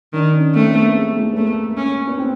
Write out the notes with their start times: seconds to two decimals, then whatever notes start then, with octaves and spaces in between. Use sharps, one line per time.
0.13 D#3 D4
0.34 C#4
0.55 A3 C4
0.68 B3
0.82 A#3
0.95 G#3
1.16 A3
1.33 B3
1.37 A3 A#3
1.77 C#4
2.07 B3
2.18 C4